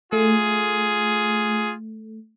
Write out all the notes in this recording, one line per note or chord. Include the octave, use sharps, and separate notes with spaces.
A3 F4 G#4